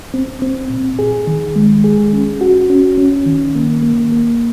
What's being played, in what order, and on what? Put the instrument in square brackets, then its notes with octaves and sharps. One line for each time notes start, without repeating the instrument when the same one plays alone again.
[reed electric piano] C4
C4
A#2
G#4
D#3
G#3
G#4
C#4
F#4
C#4
C#4
D#3
A#3
A#3
A#3